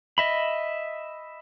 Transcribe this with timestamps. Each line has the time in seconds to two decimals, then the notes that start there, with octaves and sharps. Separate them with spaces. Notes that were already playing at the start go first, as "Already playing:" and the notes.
0.18 D#5 E5 B5